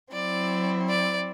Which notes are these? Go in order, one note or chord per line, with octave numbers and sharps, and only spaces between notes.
F#3 C4 E4 D5
D5